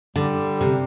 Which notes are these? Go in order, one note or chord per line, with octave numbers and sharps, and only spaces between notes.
D3 G3
C3